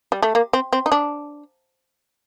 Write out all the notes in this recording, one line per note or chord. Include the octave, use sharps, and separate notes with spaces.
G3
A3
A#3
C4
C4
D#4
D4